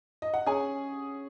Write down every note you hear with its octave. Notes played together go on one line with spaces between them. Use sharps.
D#5
F#5
C#4 G#4 G#5